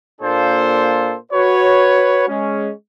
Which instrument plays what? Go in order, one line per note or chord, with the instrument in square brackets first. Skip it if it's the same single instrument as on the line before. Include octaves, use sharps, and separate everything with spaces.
[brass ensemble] A#2 A#3 D4 F4 A4 C5
F#4 B4 C#5
G#3 C#4